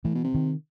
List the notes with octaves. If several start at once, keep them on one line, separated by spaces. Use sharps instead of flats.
A2 E3
B2
C3
D#3